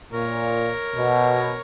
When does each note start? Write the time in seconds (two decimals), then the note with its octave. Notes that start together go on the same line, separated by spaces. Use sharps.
0.12 A#2 A#4 C#5
0.96 B2